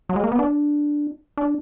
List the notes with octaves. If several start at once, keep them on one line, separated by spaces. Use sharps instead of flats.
F#3
G#3
A#3
B3
D4
D4